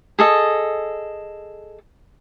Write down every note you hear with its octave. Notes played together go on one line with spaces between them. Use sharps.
G#4 A4 D#5